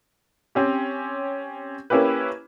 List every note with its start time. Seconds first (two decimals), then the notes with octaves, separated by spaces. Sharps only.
0.55 C4 C#4 G4
1.90 A#3 C#4 E4 G4 B4